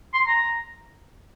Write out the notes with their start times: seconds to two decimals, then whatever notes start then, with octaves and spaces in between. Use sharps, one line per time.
0.14 C6
0.27 A#5